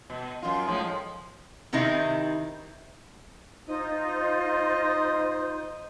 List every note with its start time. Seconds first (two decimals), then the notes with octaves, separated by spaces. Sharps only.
0.10 B2
0.42 F#2 F4
0.67 A2 F3 G#3
1.73 C3 D#3 C4 D#4 E4
3.67 D#4 F4 C5 D#5